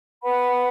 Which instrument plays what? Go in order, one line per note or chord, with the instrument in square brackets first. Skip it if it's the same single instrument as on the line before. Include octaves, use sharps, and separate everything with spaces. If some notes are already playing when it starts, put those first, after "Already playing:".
[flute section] B4 F#5 B5